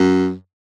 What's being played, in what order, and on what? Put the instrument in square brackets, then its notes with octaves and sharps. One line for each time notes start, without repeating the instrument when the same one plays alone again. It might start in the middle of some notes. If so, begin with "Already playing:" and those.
Already playing: [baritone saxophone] F#2